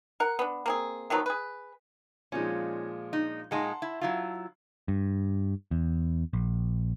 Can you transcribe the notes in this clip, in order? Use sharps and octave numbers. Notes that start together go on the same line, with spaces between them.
A#4 F#5
B3 D4
A#3 C4 G#4
D#3 F3 F#3 B3
G#4 B4
A#2 F3 G#3 C#4 D#4
D#4
A#2 G#3 D#4 F#5 A5 C6
E4
F#3 E4 F4
G2
E2
A#1